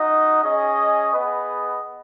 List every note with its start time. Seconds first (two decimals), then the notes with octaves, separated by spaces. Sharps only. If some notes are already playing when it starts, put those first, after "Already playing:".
Already playing: D#4 F#4 D#5
0.42 C#4 G#4 D#5
1.13 B3 G#4 B4 D#5